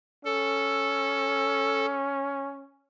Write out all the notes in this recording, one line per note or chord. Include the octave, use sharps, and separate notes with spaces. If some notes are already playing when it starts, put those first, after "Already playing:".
C#4 A4